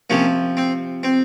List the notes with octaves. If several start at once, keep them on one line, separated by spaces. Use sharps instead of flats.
C3 F3 A#3 C#4
C4
C4